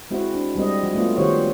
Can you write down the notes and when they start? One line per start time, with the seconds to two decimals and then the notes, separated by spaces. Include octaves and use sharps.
0.11 G#3 C4 E4 F#4
0.34 D4
0.56 G3 G#3 C4 D#5
0.83 F3 F#4
0.95 A3 B3 C#4 F4
1.16 D#3 G4 C5 C#5 F#5